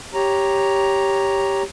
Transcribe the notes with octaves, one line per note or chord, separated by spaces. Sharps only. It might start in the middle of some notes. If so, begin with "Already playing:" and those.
G4 C#5 A#5